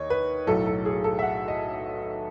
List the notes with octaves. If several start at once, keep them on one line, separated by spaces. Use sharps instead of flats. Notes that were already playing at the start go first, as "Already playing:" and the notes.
Already playing: D#2 D#3 C#5 D#5
B4
B1 A2 F#3 A4
A4
G#4
A4
E5
F#5
D#5